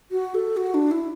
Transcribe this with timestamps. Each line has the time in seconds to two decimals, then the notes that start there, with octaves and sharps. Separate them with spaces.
0.11 F#4
0.35 A4
0.57 F#4
0.74 D4
0.91 E4